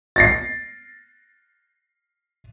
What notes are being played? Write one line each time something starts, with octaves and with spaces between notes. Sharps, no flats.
A6 A#6 C7